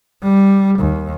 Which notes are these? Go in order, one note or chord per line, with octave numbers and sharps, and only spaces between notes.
G3
D#2